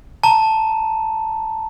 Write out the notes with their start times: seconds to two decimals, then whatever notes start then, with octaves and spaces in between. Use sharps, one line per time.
0.23 A5 A#5